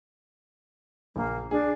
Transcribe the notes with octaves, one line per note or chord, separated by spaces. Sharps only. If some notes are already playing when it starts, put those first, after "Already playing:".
A#1 A#3
D4 G#4